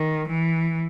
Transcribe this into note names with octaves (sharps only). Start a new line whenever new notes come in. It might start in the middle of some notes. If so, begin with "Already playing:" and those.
Already playing: D#3
E3